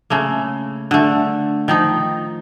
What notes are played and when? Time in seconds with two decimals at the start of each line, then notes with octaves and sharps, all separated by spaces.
0.10 C#3 A3 A#3
0.91 D3 A3
1.68 D#3 F3 D#4